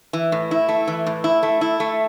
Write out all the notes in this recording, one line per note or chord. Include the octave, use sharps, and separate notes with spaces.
E3
A2
E4
A3
E3
A2
E4
A3
E4
A3